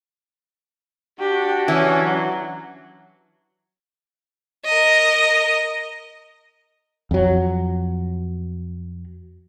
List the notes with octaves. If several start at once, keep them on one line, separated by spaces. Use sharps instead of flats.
D4 F#4 G4
E3 C#4
F#3
A#4 D#5
F2 F#3